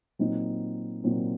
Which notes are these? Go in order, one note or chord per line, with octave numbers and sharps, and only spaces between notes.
A#2 F#3 C4 D#4
A#2 F#3 C4 D#4